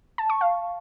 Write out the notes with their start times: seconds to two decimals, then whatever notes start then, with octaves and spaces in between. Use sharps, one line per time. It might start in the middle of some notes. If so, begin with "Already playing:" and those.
0.18 A5
0.30 C#6
0.41 F5